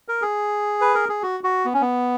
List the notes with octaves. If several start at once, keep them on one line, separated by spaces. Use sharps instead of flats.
A#4
G#4
B4
A#4
G#4
F#4
F#4
B3
C#4
B3